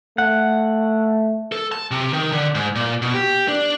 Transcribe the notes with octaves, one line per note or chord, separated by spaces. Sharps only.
A3 F#5
A4
A5
C3
D#3
D3
G#2
A#2
B2
G4
D4